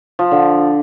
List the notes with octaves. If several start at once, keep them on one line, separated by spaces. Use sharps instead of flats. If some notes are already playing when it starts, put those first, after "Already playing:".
F3
D3